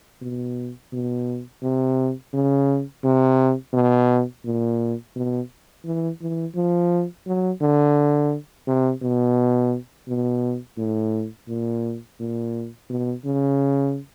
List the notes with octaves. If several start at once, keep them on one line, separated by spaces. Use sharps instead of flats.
B2
B2
C3
C#3
C3
B2
A#2
B2
E3
E3
F3
F#3
D3
C3
B2
B2
A2
A#2
A#2
B2
C#3